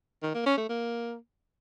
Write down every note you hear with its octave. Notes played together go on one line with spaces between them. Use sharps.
D#3
A#3
C#4
A3
A#3